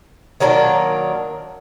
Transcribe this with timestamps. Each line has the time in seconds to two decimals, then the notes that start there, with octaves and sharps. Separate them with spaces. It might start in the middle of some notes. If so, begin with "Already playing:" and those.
0.40 D#3 F#3 A#3 D4